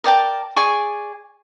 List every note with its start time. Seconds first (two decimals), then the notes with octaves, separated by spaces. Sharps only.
0.04 A#4 D5 G5 A5
0.56 G#4 D5 G#5 C#6